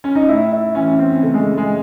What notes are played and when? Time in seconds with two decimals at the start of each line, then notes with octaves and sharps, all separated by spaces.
0.04 C#4
0.15 D#4
0.28 A2 E4
0.52 E4
0.75 E3 C#4
0.99 C4
1.23 C#3 A3
1.34 G#3
1.58 G#3